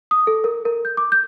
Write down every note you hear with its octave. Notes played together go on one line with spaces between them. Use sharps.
D#6
A4
A#4
A#4
G6
D6
G6